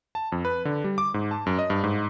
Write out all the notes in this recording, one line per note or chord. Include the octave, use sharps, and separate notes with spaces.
A5
F2
B4
D3
G3
D6
G#2
A5
F#2
D#5
G2
G#2